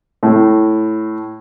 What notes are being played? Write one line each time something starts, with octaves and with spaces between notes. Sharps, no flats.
A2